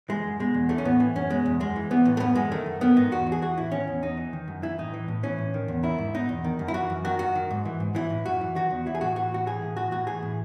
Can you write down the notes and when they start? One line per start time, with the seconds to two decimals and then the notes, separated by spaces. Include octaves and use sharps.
0.09 E3 G#3
0.24 F#2
0.40 B2 G#3
0.54 E2
0.69 E3 A3
0.78 C#4
0.85 A2 B3
1.00 E3
1.15 F#2 C#4
1.30 B2 G#3
1.46 E2
1.61 F#2 G#3
1.76 E3
1.91 E3 B3
2.05 A2
2.17 A3
2.20 F#2 B3
2.35 E3 G#3
2.52 D#3 A3
2.66 F#2
2.81 D#3 B3
2.96 G#2 D#4
3.11 E2 F#4
3.27 E3
3.32 G#4
3.42 E3 F#4
3.57 A2 E4
3.72 D#3 C#4
3.88 E2
4.02 E2 D#4
4.17 E3
4.33 D#3
4.48 F#2
4.62 E3 E4
4.78 A2 D#4
4.94 E3
5.08 A2
5.23 E3 C#4
5.38 A2
5.54 D#3
5.68 E2
5.83 D#3 E4
5.98 G#2
6.14 B2 D#4
6.29 E2
6.44 D#3
6.59 F#2
6.68 E4
6.74 E3 F#4
6.90 F#2
7.05 D#3 F#4
7.19 F#2 F#4
7.35 D#3
7.51 G#2
7.65 E3
7.80 G#2
7.95 E3 E4
8.10 A2
8.26 F#2 F#4
8.41 E3
8.55 D#3 F#4
8.71 E2
8.86 E3 E4
8.95 G#4
9.01 A2 F#4
9.16 E3 F#4
9.32 A2 F#4
9.46 E3 G#4
9.62 A2
9.77 E3 F#4
9.91 A2 F#4
10.07 E3 G#4
10.23 A2